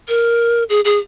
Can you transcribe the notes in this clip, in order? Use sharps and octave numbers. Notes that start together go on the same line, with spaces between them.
A#4
G#4
G#4